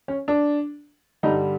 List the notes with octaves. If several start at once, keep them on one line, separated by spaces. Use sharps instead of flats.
C#4
D4
G2 D3 G3 D#4